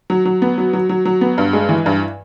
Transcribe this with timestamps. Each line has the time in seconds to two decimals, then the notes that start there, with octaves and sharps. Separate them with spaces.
0.10 F#3
0.25 F#3
0.42 B3
0.58 F#3
0.73 F#3
0.89 F#3
1.05 F#3
1.21 B3
1.38 G2
1.53 G#3
1.69 E3
1.86 G2